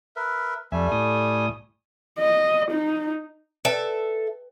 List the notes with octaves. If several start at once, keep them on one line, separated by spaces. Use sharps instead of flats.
A#4 B4 E5
F2 G3 A3 E5 G#5
A2 D#6
D#5
D#4
A4 B4 E5 G5